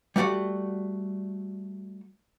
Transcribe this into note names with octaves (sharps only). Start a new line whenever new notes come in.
G3 A3 F#4 D5 F#5